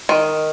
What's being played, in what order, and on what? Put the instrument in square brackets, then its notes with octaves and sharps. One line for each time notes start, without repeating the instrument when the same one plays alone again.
[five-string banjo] D#3